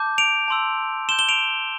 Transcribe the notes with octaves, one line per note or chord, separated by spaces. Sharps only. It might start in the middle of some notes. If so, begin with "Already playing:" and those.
Already playing: A5 D6 G6
D7 F7
A5 C6 E6
C6 G6 E7 G7
E7 G7
D7 F7